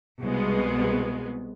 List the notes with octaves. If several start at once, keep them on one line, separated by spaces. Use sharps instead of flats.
C2 B2 G#3 B3